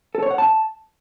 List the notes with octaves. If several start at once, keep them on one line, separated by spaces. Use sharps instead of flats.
A4
C#5
F#5
A5